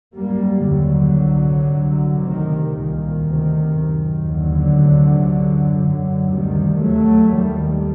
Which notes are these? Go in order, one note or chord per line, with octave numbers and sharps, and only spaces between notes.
F#2 G3 A#3
D#2 D3 F#3
C2 C3
C2 C3
D2 C3 D#3
C2 A#2 D#3
D2 C3
F#2
D#2 D3 F#3
D2 C3
F#2
F#2 D3 F#3
D2 C3 D#3 G3
D#2 F#3 A3
D#2 D#3 G3